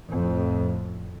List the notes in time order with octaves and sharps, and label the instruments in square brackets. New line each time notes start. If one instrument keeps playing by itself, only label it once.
[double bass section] F2 A2